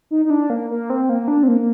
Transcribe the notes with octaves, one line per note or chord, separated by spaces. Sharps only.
D#4
D#4
D4
A#3
A#3
C4
A#3
D4
C4
A#3